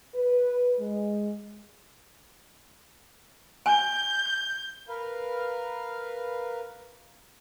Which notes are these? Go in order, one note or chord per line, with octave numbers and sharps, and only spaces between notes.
B4
G#3
G#5 G6
A#4 B4 F5